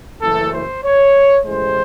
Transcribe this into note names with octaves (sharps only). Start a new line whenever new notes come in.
F#1 F#2 E3 A3 A4
C5
C#5
A1 A2 G#3 C5